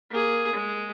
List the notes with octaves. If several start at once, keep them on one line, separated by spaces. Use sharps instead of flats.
A#3 G#4
G#3